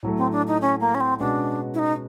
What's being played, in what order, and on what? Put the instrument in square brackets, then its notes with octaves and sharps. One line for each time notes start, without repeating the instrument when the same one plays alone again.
[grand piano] A2 F#3 A3
[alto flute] C4
D4
D#4
C#4
A#3
C#4
C4
[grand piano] B2 G#3 C#4 F#4 [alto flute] D4
[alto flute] E4
D#4